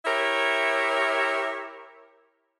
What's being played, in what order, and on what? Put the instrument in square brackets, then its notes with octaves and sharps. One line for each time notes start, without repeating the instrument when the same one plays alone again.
[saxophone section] E4 G4 A#4 C#5 E5